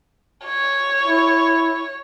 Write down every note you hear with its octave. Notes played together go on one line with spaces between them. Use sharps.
C#5
E4